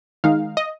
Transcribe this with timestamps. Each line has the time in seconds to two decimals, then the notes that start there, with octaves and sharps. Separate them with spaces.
0.24 D#3 G#3 D#4 F5
0.57 D#5